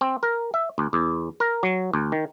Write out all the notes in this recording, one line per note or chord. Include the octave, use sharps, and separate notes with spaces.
C4
A#4
E5
D2
E2
A#4
F#3
D2
D#3